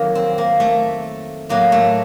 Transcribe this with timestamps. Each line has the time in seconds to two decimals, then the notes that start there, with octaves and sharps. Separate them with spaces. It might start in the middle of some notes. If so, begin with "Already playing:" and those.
Already playing: F2 D#3 F#3 A#3
0.15 C4
0.38 A#3
0.60 A3
1.49 A2 F#3 A#3
1.72 A3